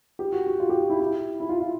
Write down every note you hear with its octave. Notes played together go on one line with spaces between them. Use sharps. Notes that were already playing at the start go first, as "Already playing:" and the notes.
G4
F#4
F#4
F4
G4
F#4
E4
E4
E4
F4
F4